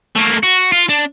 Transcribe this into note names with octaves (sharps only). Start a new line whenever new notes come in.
A3 A#3
F#4
F4
D4